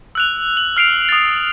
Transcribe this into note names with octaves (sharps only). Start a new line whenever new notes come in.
E6 F#6 F7
F#7
F6 C7 D7 F7
D#6 A6